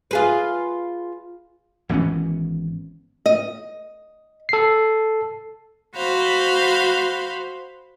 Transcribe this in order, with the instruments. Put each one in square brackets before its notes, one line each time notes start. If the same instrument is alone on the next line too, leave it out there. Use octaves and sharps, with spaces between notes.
[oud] F4 G#4 B4
[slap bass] G#1 E3 B3 C#4
[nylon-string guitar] D#5
[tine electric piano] A4 C7
[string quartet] F#4 C5 F5 B5